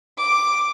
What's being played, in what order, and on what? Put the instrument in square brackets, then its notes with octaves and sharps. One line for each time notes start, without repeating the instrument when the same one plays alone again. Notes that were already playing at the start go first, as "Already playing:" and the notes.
[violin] D6